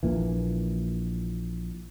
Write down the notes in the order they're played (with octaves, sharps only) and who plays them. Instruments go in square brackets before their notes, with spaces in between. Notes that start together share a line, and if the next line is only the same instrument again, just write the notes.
[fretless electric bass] A#1 A#2 E3